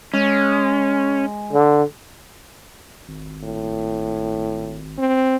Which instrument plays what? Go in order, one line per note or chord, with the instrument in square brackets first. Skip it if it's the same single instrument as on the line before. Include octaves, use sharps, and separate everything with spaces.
[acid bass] G#3 [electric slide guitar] C#4
[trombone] D3
[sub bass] G#1
[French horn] A2
C4